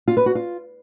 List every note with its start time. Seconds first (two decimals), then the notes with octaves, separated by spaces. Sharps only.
0.08 F4
0.17 B4
0.26 F#4
0.35 F4